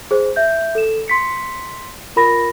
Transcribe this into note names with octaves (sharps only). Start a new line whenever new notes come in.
G#4 C5
E5 G6
A4 E7
C6 B6 C#7
F4 A#4 B5 A#6